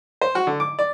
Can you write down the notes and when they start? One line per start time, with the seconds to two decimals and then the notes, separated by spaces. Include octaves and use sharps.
0.21 C5
0.35 F#4
0.47 D3
0.60 D6
0.79 D5